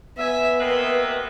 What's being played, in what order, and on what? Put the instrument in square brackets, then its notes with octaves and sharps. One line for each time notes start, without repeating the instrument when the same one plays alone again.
[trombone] B3 [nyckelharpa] E5 G#5
[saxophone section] C3 A#3 B4 [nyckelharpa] D#5 E5